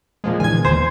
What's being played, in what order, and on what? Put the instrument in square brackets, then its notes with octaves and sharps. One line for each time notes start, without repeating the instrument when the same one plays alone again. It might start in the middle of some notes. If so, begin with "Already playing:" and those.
[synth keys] A#2 F3 G#3
[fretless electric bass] D3 E3 B3 [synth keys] G#5 G#6
[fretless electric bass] D#2 [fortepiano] C5